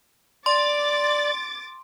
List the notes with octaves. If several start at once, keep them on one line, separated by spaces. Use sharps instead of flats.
D5 C6 D6 A6